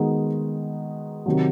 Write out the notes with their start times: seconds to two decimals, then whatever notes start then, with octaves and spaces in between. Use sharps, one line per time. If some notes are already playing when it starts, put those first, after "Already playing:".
Already playing: D#3 G#3 B3 D#4 F#4
1.26 C3 D#3 F#3